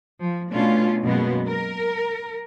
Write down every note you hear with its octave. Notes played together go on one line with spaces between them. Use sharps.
F3
B2 A3 C#4 D4 F4
F#2 B2 G#3 A#3 B3
A#4